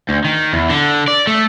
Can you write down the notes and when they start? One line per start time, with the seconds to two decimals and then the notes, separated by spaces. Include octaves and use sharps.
0.09 D2
0.25 D#3
0.53 E2
0.70 D3
1.08 D5
1.27 A3